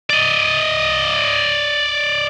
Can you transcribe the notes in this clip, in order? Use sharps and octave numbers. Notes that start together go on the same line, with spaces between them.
D5 D#5